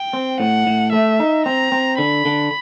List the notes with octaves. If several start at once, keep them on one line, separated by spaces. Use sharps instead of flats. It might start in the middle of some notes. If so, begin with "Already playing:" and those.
Already playing: G5
C4
A2 F#5
A2
A3 E5
D#4
C4 A#5
C4
D3 B5
D3